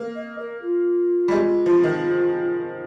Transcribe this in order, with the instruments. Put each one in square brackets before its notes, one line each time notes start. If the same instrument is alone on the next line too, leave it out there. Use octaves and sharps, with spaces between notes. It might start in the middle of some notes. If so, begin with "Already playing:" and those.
Already playing: [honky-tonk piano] A#3
[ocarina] D#5
A#4
F4
[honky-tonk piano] G3
G#3
F3
D#3
[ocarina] F4